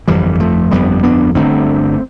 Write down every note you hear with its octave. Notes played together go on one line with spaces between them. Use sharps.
G1 F2 D3 E3 G3
F3 A3
G1 F2 D3 G3 B3
B3 D4
G1 G2 D3 A3 C4